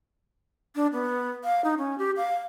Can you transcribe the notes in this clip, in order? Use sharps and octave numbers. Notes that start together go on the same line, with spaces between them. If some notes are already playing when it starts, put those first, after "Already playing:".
D4
B3
F5
D#4
C#4
G4
F5